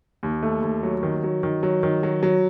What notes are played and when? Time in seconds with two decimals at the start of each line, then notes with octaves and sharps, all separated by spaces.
0.23 D#2
0.43 A3
0.62 D#2
0.83 F#3
1.03 D#3
1.23 F#3
1.43 D#3
1.63 F#3
1.83 D#3
2.03 F#3
2.23 F#3